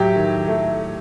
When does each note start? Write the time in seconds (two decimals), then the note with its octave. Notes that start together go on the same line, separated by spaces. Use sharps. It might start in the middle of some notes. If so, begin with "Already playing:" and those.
Already playing: A2 F#3 G4
0.16 D#3
0.48 A3